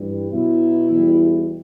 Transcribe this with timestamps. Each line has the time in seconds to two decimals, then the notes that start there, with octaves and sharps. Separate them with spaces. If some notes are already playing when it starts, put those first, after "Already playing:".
Already playing: G2 E3 G3
0.31 B2 F#3 E4
0.90 E2 B2 G3